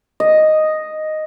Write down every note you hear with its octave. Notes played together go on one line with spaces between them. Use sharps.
D#5